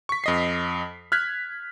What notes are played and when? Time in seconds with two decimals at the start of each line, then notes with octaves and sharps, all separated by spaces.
0.09 C#6 B6
0.24 F2 D#5 C7
1.12 F6 F#6 G#6 B6